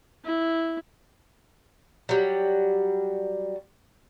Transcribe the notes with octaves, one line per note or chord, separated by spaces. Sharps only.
E4
F#3 G3